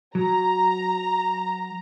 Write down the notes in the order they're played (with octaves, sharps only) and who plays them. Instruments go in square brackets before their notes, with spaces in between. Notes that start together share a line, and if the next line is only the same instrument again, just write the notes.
[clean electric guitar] F#3 [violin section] A#5